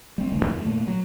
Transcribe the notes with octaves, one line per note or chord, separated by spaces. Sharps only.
G3 C4
D#1 C#2 D3 A3
F2 D#3 F3
A#2 A3
F#3